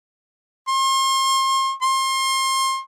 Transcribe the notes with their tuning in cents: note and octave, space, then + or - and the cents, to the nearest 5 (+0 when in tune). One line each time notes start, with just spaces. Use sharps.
C6 +40
C6 +30